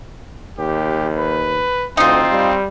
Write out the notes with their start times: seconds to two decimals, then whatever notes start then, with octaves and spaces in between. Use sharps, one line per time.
0.59 D#2 G4
1.16 B4
1.97 D2 C4 D#4 F4
2.31 G3